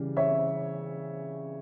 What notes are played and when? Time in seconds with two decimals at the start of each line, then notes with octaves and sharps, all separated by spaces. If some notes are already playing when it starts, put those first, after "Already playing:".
Already playing: C#3 E3 G3
0.17 C#5 E5